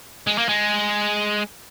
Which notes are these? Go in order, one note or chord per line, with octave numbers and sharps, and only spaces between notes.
G#3
A#3
G#3